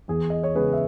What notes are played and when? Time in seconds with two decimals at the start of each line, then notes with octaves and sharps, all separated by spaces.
0.08 E2 G#4
0.30 D#5
0.43 C#5
0.55 C#3 G#3 B3 G#4 B4
0.73 E5